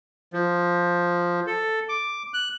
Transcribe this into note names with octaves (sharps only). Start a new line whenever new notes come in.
F3
A4
D6
F#6